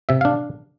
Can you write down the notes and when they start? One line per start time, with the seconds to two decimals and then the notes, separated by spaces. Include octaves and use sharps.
0.09 C3 E5
0.21 D4 F5